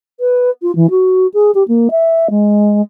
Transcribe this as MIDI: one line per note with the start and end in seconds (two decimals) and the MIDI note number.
0.20 0.50 71
0.62 0.74 65
0.75 0.90 52
0.90 1.27 66
1.34 1.51 68
1.55 1.63 67
1.68 1.88 58
1.91 2.28 76
2.30 2.81 56